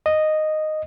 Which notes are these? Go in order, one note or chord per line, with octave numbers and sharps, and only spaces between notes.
D#5